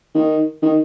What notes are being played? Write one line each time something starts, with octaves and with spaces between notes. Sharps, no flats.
D#3
D#3